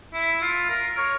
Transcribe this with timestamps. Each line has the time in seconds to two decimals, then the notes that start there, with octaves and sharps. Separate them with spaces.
0.14 E4
0.42 F4
0.70 A#4
0.98 C#5